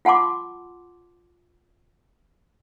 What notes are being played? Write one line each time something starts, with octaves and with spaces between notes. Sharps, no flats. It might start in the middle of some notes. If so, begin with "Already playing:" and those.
F4 F#5 A5 C6 D6